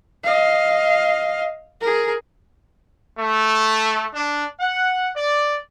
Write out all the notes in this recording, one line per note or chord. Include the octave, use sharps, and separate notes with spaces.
D#5 F5
G#4 A#4
A3
D4
F#5
D5